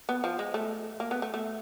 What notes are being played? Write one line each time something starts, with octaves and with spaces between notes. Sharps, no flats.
B3
F3
G#3
A3
A#3
B3
A3
A3